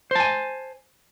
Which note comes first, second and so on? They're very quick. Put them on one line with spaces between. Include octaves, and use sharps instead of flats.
C5 A5 G#5